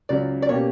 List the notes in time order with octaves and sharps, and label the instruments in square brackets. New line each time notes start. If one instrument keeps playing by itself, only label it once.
[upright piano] C#2 C#3 F#3 [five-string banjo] D5
[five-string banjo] D5
[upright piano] B2 A#3 C#4 G4 [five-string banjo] C#5